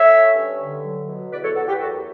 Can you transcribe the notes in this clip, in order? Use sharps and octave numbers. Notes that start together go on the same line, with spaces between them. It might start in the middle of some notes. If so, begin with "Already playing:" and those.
Already playing: A3 C#5 E5
C#4
G2
D3
F#3
B2
E2 B4 D5
A4 C#5
E2 F#4 A4
G4 B4
F#2 F#4 A4